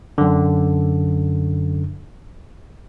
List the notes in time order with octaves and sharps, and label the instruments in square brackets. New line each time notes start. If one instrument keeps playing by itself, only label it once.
[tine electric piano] F#2 D3